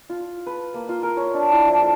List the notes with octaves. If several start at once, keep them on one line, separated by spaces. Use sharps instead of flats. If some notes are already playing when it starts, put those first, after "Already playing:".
F4
B4
A#3
F4
A#4
C#5
D4
E4
F3
A4